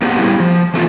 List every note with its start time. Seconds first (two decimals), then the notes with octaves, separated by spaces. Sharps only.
0.02 A#3 B3 G4 G#4 F5 F#5
0.19 G3 B3 E4
0.40 F3
0.74 E3 A3 B3 F4